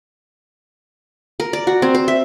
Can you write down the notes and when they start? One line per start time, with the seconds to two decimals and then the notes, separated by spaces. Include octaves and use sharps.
1.40 A#4
1.53 D5
1.67 F#4
1.82 C4
1.95 C5
2.08 E5